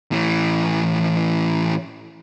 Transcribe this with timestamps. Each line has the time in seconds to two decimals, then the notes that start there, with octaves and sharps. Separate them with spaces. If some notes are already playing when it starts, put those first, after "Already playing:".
0.12 A2 E3